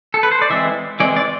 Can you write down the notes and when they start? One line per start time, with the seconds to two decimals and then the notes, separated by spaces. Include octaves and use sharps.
0.14 A4
0.23 B4
0.31 C5
0.42 D5
0.50 E3 G#3 C4 E5
1.00 E3 G#3 C4 D5
1.16 D5